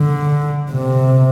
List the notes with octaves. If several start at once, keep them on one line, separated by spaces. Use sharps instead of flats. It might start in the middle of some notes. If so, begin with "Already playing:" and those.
Already playing: D3
C3